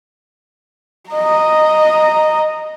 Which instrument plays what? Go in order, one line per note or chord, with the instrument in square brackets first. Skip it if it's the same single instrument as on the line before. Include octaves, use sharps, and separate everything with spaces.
[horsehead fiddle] D#5 A#5